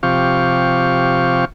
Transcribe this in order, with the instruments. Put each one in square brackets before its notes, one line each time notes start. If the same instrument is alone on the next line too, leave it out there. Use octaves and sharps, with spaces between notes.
[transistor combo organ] C3 F3 G4 F5 C#6